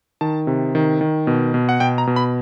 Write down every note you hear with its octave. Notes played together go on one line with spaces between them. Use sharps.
D#3 A5
C3
D#3
D#3
B2
B2
F#5
B2 G5
A#5
B2
B5